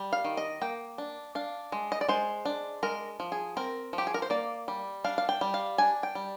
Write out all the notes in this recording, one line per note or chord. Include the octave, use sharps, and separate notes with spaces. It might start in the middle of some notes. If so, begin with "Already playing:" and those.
Already playing: G3
F5
D#3
D#5
A#3 G5
D4
D4 F5
G#3
D#5
D5
G#3 C5
D4
G#3 A#4
F3
G#4
C4 A#4
F3
G4
G#4
A#4
C5
A#3 D5
G3
D4 F5
F5
G5
G3
F5
D4 G#5
G5
G3